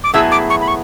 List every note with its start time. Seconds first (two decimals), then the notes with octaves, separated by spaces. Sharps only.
0.04 D6
0.13 A2 F#3 B3 E4 G#4 E6
0.31 D6
0.50 C#6
0.61 B5
0.68 C#6